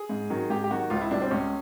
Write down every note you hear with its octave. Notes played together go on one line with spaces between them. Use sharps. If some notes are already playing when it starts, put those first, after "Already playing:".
Already playing: G#4
G#2
D#3 F#3
G#2 G4
G4
D#3 F#3 F#4
C#2 F4
E4
B2 G3 D4
C4
C#2 C#4